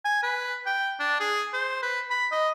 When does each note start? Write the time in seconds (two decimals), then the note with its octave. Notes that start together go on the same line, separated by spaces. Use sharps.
0.05 G#5
0.23 B4
0.66 G5
1.00 D4
1.20 G#4
1.54 C5
1.83 B4
2.10 B5
2.32 D#5